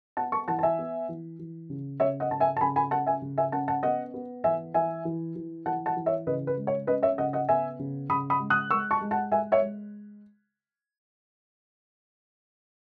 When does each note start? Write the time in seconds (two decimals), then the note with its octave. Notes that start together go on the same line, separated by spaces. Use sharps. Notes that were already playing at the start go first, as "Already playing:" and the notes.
0.17 B3 F#5 A5
0.32 A5 C#6
0.48 E3 F#5 A5
0.59 A5
0.63 E5 G#5
0.79 B3
1.09 E3
1.39 E3
1.70 C#3
2.00 C#3 C#5 E5
2.20 D#5 F#5
2.31 C#3 A5
2.40 E5 G#5
2.57 A5
2.61 C#3 G#5 B5
2.76 G#5 B5
2.91 C#4 F#5 A5
3.06 E5 G#5
3.22 C#3
3.38 E5 G#5
3.52 C#4 F#5 A5
3.68 F#5 A5
3.83 B3 D#5 F#5
4.14 B3
4.44 E3 E5 G#5
4.74 E3 E5 G#5
5.05 E3
5.36 E3
5.66 E3 F#5 A5
5.86 F#5 A5
5.97 E3
6.06 C#5 E5
6.27 C#3 B4 D#5
6.47 B4
6.57 G#3
6.67 C#5
6.87 C#4 B4 D#5
7.03 C#5 E5
7.18 C#3 D#5 F#5
7.33 D#5 F#5
7.48 B3 E5 G#5
7.79 C#3
8.09 C#3 B5 D#6
8.30 B5 D#6
8.40 G#3
8.50 D#6 F#6
8.70 G#3 C#6 E6
8.91 A5 C#6
9.01 G#3
9.11 F#5 A5
9.32 G#3 E5 G#5
9.52 C#5 E5
9.62 G#3